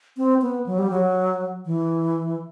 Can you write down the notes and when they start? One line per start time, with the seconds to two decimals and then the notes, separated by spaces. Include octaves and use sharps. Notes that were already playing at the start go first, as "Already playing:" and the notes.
0.17 C4
0.42 B3
0.66 F#3
0.78 G3
0.91 F#3
1.66 E3